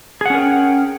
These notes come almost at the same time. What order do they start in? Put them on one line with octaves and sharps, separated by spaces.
G#4 F#5 C#4 A#4 G5